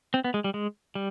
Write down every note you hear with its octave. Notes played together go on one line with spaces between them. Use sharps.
C4
B3
G#3
G3
G#3
G3